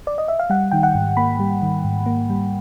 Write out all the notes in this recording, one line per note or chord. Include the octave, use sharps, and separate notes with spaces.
D5
D#5
E5
F5
G3 F#5
D#3 G5
F#5
G#2
A#3 B5
G3
D#3
G#2
A#3
G3